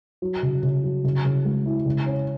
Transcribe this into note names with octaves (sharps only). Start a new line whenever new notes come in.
F#3
C#3
C#3
F#3
C#3
C#3
G#3
E4
C#3
C#4